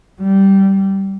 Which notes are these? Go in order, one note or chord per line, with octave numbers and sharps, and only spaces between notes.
G3